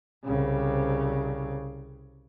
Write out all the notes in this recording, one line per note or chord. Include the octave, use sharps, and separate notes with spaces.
C2 C#3